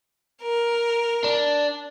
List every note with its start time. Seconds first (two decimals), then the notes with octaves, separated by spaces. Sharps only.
0.42 A#4
1.24 D4